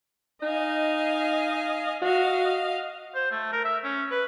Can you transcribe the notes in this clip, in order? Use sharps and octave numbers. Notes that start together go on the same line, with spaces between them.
D#4 D#5 F5 G#5
F#4 D#5 F5
C5
A3
A#4
E5
C#4
B4